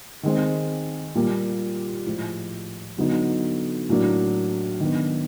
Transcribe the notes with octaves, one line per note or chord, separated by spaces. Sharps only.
D#3 G#3 C4
A#2 G3 A#3
A2 F3 G#3
D3 F#3 B3 D#4
A2 F#3 A#3 D4
D#3 F#3 B3 D4